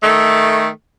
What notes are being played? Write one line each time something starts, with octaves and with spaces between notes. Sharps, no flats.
D#3 A3